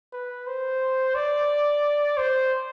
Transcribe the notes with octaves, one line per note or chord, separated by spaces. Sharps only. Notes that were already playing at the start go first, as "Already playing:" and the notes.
B4
C5
D5
C5